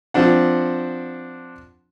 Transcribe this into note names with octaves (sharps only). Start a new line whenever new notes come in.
F3 C4 D4 F#5